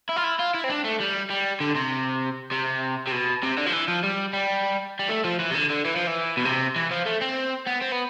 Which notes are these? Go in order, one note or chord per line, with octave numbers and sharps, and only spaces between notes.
E4
F4
E4
F4
E4
C4
D4
A3
G3
G3
D3
C3
C3
C3
B2
C3
D3
F3
E3
F3
G3
G3
G3
A3
F3
E3
C3
D3
D3
E3
F3
E3
B2
C3
E3
F3
A3
C4
B3
C4
B3